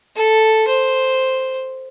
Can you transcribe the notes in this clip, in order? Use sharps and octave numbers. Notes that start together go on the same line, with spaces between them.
A4
C5